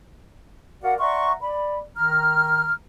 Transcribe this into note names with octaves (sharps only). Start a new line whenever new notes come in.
F#4 A#4 D5 F5 F#5
D5 E5 F#5 A#5 C6 C#6
D5 B5
D#3 A#5 F6